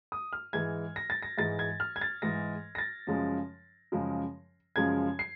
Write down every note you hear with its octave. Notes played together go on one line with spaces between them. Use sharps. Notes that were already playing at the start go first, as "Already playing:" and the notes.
D#6
F6
G#2 E3 G#3 G#6
A#6
A6
A#6
G#2 E3 G#3 A6
G#6
F6
G#6
A6
G#2 E3 G#3 A#6
A#6
A6
F#2 C#3 F3 G#3
F#2 C#3 F3 G#3
F#2 C#3 F3 G#3 G#6
C7